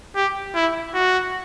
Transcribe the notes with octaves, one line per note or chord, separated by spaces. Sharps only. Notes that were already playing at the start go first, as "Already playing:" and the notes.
G4
E4
F#4